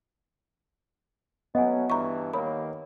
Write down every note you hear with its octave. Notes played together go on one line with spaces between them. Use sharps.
F#3 A3 B3 C#4 D#5 F#5 G#5
G2 E3 A#5 C#6
D#2 D#3 A#3 A#4 C#5 B5